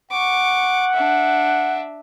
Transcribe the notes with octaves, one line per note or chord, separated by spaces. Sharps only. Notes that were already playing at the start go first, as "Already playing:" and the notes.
F#5 C#6 D6
D4 E5